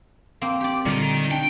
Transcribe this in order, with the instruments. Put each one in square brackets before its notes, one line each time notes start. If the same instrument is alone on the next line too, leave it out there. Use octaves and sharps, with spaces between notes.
[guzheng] A#3 C4
G4 D5
[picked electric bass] A#2 D3 G3 [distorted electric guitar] D#3
[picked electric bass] D4 [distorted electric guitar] G5